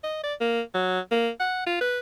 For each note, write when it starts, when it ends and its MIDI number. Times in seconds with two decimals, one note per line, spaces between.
0.04 0.20 75
0.23 0.34 74
0.41 0.61 58
0.74 0.99 54
1.11 1.29 58
1.40 1.62 78
1.66 1.78 65
1.81 2.00 71